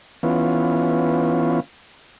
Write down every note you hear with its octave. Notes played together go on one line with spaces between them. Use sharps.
E3 B3 C#4 F4